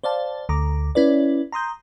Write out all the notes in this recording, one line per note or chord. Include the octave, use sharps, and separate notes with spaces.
C5 D5 F5 A5
D2 A#5 D6
C#4 E4 B4 D5
A#5 C6 D#6 G6